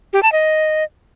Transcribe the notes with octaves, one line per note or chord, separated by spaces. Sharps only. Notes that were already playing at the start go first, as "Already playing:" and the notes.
G4
A5
D#5